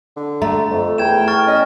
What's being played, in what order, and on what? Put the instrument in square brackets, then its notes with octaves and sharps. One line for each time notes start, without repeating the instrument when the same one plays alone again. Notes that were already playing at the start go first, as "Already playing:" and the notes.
[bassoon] D3
[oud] A3 [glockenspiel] A#5
[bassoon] F2
[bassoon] E2 [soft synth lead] G5 [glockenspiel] G#6 E7
[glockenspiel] C#6 F6 A6
[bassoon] C#4 [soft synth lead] D#5